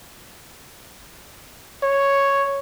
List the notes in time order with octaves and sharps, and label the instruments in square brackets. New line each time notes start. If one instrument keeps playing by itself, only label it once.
[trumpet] C#5